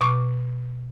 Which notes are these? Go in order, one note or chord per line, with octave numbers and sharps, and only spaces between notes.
B2 C#6 D6